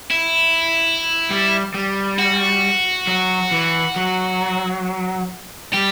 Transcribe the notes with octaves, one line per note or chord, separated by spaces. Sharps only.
E4
G3
G3
F#4
F#3
E3
F#3
G3 G4